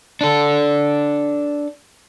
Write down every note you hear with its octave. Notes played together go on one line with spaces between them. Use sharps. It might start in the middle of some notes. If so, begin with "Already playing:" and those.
D4 A4